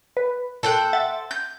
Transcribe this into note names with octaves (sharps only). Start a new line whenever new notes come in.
B4
A#2 A4 C5 G5 F#6
E5 F#5 A6
G6